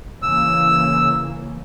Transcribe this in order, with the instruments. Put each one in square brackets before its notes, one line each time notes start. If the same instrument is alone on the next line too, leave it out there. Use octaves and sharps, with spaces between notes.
[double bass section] C#3 E3 A#3 [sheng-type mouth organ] E6